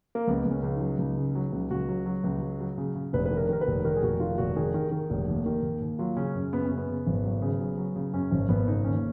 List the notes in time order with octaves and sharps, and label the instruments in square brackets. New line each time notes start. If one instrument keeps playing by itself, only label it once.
[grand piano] A#3
C#2 B3
C#2
C#4
C#2
D#4
F#3
C#2
C#3
F#3
C#2
C#2 F#4
F#3
F#3
C#2
F#3
F#3
C#3
C#3
F1 B4
B4
D#3
A#4
D#3 A#4
B4
F1
D#3 A#4
G#4
F1 F#4
D#3 F4
F1 F#4
D#3 G#4
D#3
D#3
F1
D#2
D#3
D#2
D#2
F#3 F4
C#3 C#4
F#2
F#2 B3
C#4
C#3
B3
C#3
G#1
F#3
C#3
F#3
F#3
C#3
F#2 C#4
G#1 C#4
G#1 B3
C#3 D#4
D#2 C#4